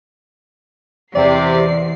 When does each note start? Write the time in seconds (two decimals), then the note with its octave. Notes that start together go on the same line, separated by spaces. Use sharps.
1.16 E2 C3 D5 C7